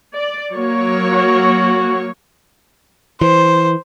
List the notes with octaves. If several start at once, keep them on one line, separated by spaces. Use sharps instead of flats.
D5
F#3 A#3 C#5
F#4
E3 C5